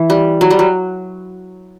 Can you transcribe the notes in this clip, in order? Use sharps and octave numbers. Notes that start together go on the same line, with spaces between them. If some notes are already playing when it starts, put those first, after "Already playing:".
Already playing: E3
G3
F#3
G3
F#3